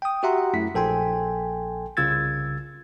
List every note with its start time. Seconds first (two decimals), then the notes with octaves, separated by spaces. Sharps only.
0.02 G5 D#6
0.23 F#4 G4 E5 F#5 A#5 C6
0.54 F#2 A3 E4 B6
0.75 A#1 A4 G5 G#5 C6
1.97 C2 C#3 F4 E6 G#6 A6